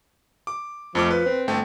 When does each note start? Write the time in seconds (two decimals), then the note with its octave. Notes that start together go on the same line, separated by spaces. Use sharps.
0.47 D6
0.95 F2 F3 A3 D6
1.10 B4
1.26 C4
1.48 G1 A3 G5